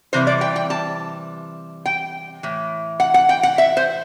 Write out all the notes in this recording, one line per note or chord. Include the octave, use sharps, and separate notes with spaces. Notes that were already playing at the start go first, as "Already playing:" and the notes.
C3 E3 G3 C5
D5
G5
G5
A5
G5
A2 E3
F#5
F#5
G5
F#5
E5
C5